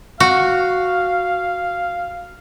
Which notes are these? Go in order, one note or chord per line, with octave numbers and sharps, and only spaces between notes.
F#4 F5